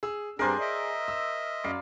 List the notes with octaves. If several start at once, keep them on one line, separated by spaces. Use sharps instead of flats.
G#4 E6
G2 C4 D4 G#4 A#4 C5 D5 G#5
D#5 E5
E6
F#2 D5 F5 B5